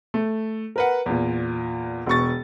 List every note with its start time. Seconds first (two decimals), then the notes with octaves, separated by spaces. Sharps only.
0.14 A3
0.76 A#4 B4 F#5
1.06 E2 A#2
2.06 E1 B2 C#6 A6